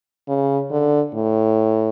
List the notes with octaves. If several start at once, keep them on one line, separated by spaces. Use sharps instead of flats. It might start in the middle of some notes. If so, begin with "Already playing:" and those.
C#3
D3
A2